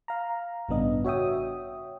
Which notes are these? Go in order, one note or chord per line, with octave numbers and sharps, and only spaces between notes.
F5 A#5
A1 G2 C#3 B3 D4 D#5
F#4 C#5 E5 G5 D#6